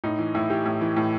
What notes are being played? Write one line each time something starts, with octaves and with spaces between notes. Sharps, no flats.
A2 D#4
E3
A2 E4
E3 G4
A2
E3
A2